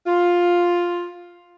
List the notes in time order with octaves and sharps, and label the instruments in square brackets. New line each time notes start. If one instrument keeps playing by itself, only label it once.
[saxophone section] F4